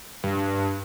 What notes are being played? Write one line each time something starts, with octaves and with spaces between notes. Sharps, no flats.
G2